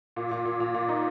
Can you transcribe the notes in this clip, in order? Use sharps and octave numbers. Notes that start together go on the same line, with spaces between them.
A#2
A#2
A#2
A#2
A#2
D#4